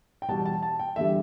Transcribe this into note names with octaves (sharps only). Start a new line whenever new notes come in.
G5
E2 B2 G3 A5
A5
A5
G5
E2 D3 G3 E5